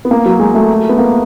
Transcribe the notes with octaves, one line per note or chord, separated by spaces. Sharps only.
B3
A#3
F#3
G#3
A3
B3
A#3